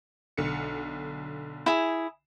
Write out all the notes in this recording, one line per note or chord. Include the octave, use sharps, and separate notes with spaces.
B1 D3 C#7
E4 G#4